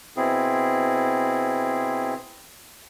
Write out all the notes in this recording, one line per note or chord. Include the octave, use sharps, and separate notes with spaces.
B2 C4 E4 G#4